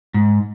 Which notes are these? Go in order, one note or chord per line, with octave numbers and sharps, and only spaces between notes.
G#2